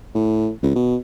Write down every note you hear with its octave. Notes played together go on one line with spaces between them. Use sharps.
A2
C#2
B2